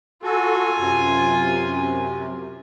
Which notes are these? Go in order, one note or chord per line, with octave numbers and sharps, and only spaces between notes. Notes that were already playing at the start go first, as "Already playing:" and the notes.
F4 F#4 A4 G#5
F#2 C3